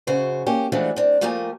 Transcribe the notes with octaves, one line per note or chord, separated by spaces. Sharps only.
F#2 C#3 F#4 C5
A#3 C#4 G4
E3 F3 G#3 A3 D4 F#4
C4 D4
F3 A3 A#3 G4 A#4 G#5